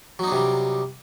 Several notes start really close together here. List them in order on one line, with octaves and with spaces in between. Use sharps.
F#3 D#4 D4 C3 G3